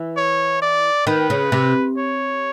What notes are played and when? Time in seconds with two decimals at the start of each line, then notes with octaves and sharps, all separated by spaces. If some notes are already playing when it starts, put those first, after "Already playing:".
Already playing: E3
0.17 C#5
0.62 D5
1.07 D#3 B4
1.30 C#3
1.52 C3
1.97 C#5